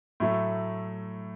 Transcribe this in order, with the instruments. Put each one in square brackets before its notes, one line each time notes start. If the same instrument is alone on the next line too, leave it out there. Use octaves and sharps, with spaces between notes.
[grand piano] A2 F#3 A3